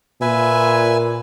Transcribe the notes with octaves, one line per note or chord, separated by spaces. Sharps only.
A#2 B4 E5 G#5